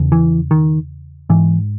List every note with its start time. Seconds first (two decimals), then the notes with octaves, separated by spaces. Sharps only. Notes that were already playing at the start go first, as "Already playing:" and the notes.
Already playing: E2 C#3
0.12 E3
0.51 D#3
1.30 G#2 E3